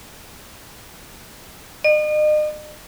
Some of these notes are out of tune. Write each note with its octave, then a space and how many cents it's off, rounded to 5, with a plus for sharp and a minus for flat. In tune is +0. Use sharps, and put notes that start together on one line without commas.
D#5 -40